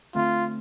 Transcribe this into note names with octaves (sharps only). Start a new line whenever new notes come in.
D3 A3 C4 F4